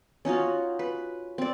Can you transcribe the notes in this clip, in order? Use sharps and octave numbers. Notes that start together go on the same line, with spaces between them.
C#4 D#4 F4 F#4
B4
C4 D5